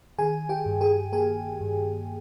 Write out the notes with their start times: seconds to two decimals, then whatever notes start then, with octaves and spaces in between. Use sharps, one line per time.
0.18 D#3 G#4 G#5
0.49 G4 G5
0.66 G2
0.81 G#4 G#5
1.13 A#3 G#4 G#5
1.61 G2